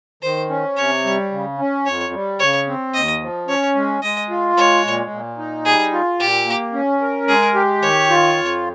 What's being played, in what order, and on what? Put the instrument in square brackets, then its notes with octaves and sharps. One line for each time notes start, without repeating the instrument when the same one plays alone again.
[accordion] D#3 [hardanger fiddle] C5
[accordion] C#4
[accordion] C3 [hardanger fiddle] C#5
[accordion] G3
C#3
C#4
[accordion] F2 [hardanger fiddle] C#5
[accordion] G3
[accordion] C#3 [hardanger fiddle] C#5
[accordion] C4
[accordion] D#2 [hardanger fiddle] D#5
[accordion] F3
[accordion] C#4 [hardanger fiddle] C#5
[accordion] G#3
[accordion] G#3 [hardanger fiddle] D#5
[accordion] F4
[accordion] G#3 [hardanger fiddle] C#5
[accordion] A#2
A#2
D#4
[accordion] G3 [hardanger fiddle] G#4
[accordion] F4
[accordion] A#2 [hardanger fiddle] G4
[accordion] A#3
C#4
A#4
[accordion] G#3 [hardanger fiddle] G#4
[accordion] G4
[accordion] D#3 [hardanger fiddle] C#5
[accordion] F4
F2